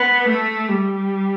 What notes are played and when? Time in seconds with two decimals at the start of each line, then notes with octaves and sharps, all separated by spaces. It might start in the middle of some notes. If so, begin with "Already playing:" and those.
Already playing: B3
0.29 A3
0.69 G3